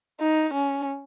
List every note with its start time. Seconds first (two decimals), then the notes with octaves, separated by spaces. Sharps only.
0.20 D#4
0.54 C#4